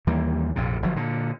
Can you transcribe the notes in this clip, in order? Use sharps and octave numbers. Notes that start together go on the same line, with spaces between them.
D#2 E3 G3 A#3
A#1 F2 C3
G1 F3 F#3
A#2 D3